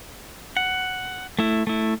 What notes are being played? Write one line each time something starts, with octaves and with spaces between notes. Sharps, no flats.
F#5
A3 E4
A3 E4